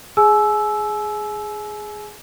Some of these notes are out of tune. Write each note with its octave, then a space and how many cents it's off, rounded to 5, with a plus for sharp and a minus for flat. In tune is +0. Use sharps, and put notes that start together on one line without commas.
G#4 +5 G#5 +40 E6 +0